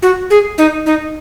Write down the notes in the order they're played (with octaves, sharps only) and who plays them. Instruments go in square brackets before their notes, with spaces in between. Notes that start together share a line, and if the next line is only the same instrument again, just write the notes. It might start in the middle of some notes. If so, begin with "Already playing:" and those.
[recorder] F#4
G#4
D#4
D#4